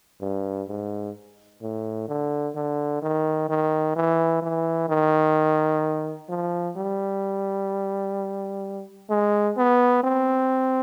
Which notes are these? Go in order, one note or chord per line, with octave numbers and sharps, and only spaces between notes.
G2
G#2
A2
D3
D3
D#3
D#3
E3
E3
D#3
F3
G3
G#3
B3
C4